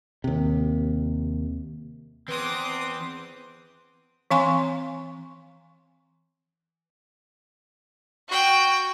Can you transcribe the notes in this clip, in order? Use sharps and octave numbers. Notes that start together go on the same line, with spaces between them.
D#2 C3
E2 C4 B4 C5 D6 D#6
E3 C4 F5 G#5 C6 C#6
F#4 G5